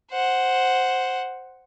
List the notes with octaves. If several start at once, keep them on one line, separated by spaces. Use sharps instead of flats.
C5 F#5